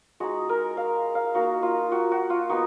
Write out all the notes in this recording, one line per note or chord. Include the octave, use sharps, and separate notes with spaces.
G#3 D#4 F#4
A#4
F5
F5
A#3 D#4 F#4
F4
F#4
F#4
F4
B3 D#4 F#4